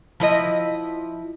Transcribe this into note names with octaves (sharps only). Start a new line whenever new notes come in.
F3 E4 D#5